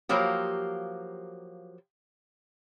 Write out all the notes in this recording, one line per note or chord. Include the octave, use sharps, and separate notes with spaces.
F3 F#3 A#3 G4